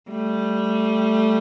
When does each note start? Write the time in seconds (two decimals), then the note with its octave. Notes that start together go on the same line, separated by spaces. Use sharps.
0.11 G3 A3